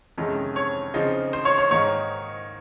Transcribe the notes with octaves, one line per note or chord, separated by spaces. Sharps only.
F2 C3 D#3 G#3 C#4
C#5
C#3 F3 C4 D#4
C5
C#5
C#5
G#2 D#3 A#3 D#4 C#5